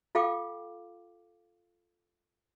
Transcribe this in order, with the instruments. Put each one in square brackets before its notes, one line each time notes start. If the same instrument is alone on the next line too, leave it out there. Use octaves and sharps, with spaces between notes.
[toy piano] F4 A4 F5 G5 D6